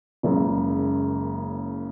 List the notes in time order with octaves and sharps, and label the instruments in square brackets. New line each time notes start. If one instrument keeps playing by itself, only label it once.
[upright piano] F#1 F#2 C#3 G#3